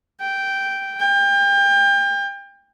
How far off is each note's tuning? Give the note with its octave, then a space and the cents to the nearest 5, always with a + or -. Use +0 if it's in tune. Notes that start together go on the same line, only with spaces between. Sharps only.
G5 -5
G5 +30